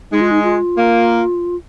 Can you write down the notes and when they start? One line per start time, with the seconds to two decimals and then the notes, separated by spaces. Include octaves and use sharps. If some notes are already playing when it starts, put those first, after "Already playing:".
0.11 G#3 D#4
0.21 F4
0.31 D#4
0.44 F4
0.76 A#3